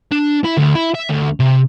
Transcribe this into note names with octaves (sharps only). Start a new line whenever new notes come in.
D4
E4
D2
E4
E5
D2
C3